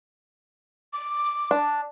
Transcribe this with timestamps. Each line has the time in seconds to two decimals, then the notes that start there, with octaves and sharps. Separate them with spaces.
0.93 D6
1.51 D4